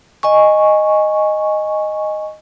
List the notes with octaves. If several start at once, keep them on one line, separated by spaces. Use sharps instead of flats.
D#5 G#5 C#6